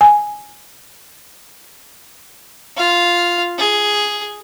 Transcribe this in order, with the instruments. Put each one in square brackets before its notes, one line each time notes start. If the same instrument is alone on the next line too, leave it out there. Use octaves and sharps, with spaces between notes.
[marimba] G#5
[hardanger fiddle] F4 F5
G#4